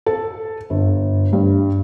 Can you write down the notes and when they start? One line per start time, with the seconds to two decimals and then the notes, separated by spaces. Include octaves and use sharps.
0.06 A4
0.70 G1
1.33 G2